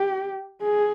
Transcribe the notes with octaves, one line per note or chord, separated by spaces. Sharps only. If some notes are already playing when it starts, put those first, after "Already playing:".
Already playing: G4
G#4